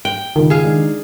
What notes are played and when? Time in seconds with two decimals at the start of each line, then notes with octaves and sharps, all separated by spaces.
0.05 G5
0.36 C#2 D#3
0.50 G#4 F5
0.64 G#3 D4 D#4